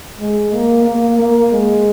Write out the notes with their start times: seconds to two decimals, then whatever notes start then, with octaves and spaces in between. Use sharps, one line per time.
0.20 G#3
0.53 A#3
0.86 A#3
1.18 A#3
1.52 G#3